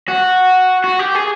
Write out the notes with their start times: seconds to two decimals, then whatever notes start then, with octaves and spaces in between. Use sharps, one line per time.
0.08 F#4
0.84 F#4
0.99 G4
1.15 G#4